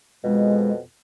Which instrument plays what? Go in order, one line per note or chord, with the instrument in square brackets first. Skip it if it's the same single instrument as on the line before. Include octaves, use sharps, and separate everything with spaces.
[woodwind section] F2 B2 [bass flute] G#3